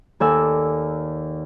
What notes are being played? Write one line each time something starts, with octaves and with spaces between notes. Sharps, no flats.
D#2 A4 A#4 D5 G#5 E6